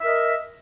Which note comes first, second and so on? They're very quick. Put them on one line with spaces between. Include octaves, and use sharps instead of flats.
E5 A#4 D#5